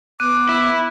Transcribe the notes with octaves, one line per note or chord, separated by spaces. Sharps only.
B3 D6 F#6 D#7
E4